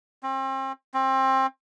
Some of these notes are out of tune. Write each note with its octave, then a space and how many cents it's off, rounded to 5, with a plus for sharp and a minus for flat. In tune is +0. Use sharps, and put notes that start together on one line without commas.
C4 +35
C4 +25